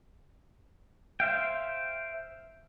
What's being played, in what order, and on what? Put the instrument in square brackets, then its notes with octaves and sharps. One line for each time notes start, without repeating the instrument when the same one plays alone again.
[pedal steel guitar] C5 E5 F5 G5